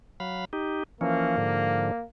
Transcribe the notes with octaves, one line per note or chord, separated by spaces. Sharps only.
F#3 F5 B5
D#4 G4
E3 F3 A#3 C#4
G#2 D3 F3